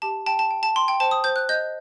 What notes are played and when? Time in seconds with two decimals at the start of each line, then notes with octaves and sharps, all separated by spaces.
0.02 G4 A5
0.26 G5 A5
0.39 A5
0.51 G5
0.63 A5
0.76 G5 C6
0.88 G5
1.00 C5 A5
1.11 D#6
1.24 C5 G6
1.36 F#6
1.49 D#5 G6